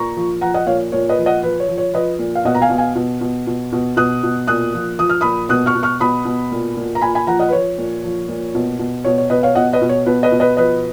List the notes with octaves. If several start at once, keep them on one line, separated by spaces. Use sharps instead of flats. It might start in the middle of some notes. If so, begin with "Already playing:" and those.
Already playing: A#2 A#5 C#6
F3
F3 F#5 A#5
D#5 F#5
A#2 C#5 F5
A#2 C#5
B4 D#5
F3
D#5 F#5
F3 B4
C#5
F3
C#5
F3 B4 D#5
A#2
F5
B2 D#5 F#5
A#5
F5 G#5
B2
F5 G#5
B2
B2
B2
B2
B2 D#6 F#6
B2
A#2 D#6 F#6
F3
F3 D#6
F6
A#2 B5 D#6
B2 D#6 F#6
C#6 F6
B2
C#6 F6
B2 B5 D#6
B2
A#2
A#2
A#5
A#2 G#5 B5
G#5 B5
F3 F#5 A#5
D#5 F#5
B4
F3 C#5
A#2
F3
A#2
B2
B2
B2 C#5
C#5
B2 B4 D#5
C#5 F5
B2 D#5 F#5
B4 D#5
B2
C#5
B2 B4
B4 D#5
B2
B4 D#5
F3 B4 D#5